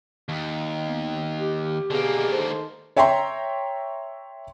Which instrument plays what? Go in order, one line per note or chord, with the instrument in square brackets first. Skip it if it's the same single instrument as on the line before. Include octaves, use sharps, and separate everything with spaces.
[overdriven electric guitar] D#2
[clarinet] B3
G4
[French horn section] B2 G#4 [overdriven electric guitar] D3 A#3
[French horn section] D#3 A4 C5
[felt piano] C#5 E5 G5 A#5 C6